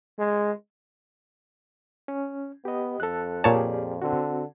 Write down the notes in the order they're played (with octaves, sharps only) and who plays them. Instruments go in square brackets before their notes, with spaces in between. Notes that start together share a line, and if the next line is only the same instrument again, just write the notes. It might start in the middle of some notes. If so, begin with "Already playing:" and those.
[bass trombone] G#3
[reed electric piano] C#4
[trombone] B3 [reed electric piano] G4 D#5
[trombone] F2 [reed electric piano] A4 F#6
[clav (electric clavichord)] A#2 C#5 A5 [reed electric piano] G4 G#4 D5
[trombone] D3 [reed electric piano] C4 F#4